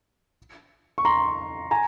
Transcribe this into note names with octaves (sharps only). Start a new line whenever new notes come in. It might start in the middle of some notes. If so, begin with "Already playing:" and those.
C#6
A#5 C6
G#5 A#5